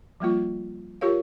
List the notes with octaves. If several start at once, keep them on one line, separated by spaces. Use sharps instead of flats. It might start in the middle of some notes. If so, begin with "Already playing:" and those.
F3 G3 A#3 F4
F4 G4 A#4 C#5 F5